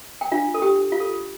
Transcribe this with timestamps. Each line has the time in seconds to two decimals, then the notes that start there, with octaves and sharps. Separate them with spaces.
0.21 G5
0.31 D4 F4 F5
0.54 A4
0.62 G4 G5
0.77 A4
0.92 F4 F5
1.00 A4